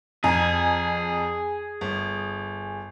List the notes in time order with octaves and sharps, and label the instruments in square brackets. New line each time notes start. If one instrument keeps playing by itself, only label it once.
[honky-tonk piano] F2 G#5 A#5 [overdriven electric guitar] G#4
[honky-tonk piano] G1